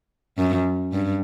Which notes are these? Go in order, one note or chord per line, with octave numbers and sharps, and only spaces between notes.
F#2
G2